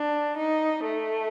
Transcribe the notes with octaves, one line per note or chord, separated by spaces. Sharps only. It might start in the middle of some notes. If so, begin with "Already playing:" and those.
Already playing: D4
D#4
A3